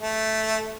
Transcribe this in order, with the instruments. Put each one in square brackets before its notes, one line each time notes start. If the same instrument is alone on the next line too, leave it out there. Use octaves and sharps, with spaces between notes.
[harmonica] A3